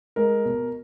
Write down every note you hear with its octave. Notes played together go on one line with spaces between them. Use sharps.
G#3 A#4
B2